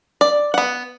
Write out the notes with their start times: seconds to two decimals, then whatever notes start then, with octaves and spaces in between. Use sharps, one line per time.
0.21 D5
0.54 B3 F#5